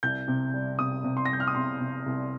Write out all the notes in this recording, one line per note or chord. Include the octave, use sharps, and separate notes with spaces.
C2 G6
C3
G3
C3 D#6
C3
C6
A#6
G3 G6
F6
D#6
C3 C6
C3
C2